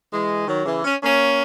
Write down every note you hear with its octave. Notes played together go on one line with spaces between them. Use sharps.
E3 G#3
D#3 F#3
C#3 E3
C#4
A#3 C#4